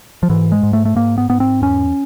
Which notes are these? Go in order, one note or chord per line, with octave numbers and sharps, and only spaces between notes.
F3
G#2 E3
G#3
G#2
A3
A3
G#2 A#3
B3
G#2 B3
C4
E2 C#4